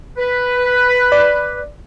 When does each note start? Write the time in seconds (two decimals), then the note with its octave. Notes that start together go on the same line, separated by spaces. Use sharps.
0.18 B4
1.12 D5